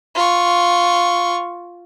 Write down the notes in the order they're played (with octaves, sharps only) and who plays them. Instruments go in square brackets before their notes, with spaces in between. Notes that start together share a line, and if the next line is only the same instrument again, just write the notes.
[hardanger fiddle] F4 C#6